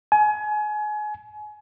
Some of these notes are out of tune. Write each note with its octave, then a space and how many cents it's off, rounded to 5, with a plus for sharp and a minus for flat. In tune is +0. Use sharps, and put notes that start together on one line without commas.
G#5 +30